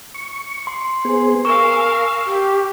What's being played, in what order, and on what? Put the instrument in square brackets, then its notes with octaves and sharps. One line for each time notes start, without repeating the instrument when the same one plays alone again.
[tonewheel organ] C#6
[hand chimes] C6
[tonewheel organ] B3 G#4 C5 [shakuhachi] G#5
[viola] A#4 F5 [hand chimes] C#6 [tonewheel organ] E6
[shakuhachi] G4